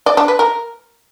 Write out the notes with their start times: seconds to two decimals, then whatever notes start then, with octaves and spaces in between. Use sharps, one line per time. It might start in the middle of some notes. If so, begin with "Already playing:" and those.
0.06 D5
0.17 D4
0.28 B4
0.39 A#4